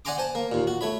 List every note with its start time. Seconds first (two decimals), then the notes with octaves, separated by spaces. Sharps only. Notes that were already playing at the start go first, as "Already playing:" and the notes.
0.05 D5 F#5 G#5 A#5 C6 D6
0.18 C5 G#5 A5
0.35 A#3
0.52 D#2 A#2
0.67 F#4
0.81 A3 C#5 B5